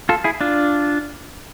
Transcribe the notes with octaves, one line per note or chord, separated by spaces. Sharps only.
F4 A4
E4 G#4
D4 F4